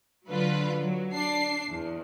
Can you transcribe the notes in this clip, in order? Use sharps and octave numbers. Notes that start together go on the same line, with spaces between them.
D3 F#3 F4 B4
F#3
D4 C7
E2